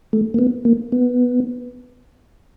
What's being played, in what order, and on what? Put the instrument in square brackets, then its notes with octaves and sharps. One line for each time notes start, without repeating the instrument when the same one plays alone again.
[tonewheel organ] A3
A#3
B3
A#3
B3